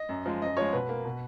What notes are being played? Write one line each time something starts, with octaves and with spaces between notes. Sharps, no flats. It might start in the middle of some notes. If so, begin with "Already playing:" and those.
Already playing: D#5
F#2
F3 G#3
F#2 D#5
F3 G#3 C#5
B2 B4
A#3
B2